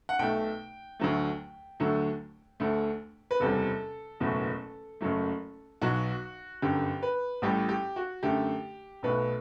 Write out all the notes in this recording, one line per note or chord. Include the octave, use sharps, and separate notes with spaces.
F#5
B1 B2 A3 G5
D2 D3 F#3 A3
D2 D3 F#3 A3
D2 D3 A3
B4
F#1 E2 C3 G3 A4
F#1 E2 B2 F#3 A3
F#1 F#2 F#3 A3
B1 B2 F#3 F#4
G1 F#2 D3 G4
B4
A1 A2 G3 G4
G4
F#4
F#2 D3 A3 G4
B1 B2 A3 B4